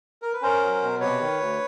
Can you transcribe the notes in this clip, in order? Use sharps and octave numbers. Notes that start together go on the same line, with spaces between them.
A#4
B4
C#4 A#4 C5
F#3
B2
C3 B4 C#5
D#3
D2